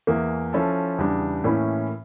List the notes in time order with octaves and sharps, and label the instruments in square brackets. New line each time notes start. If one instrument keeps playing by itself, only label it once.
[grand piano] E2 E3 A#3
F3 C#4 E4 A4
E2 C#3 G3 D4
A2 E3 A#3 C#4 E4